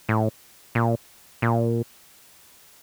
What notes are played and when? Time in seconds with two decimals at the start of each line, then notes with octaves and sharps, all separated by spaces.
0.09 A2
0.75 A#2
1.42 A#2